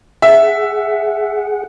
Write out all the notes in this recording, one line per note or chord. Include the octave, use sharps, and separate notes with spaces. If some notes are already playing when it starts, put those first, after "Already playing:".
G#4 E5 F#5